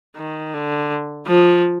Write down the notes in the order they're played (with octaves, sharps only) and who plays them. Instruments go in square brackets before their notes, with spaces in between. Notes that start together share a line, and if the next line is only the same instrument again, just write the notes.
[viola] D#3
D3
F3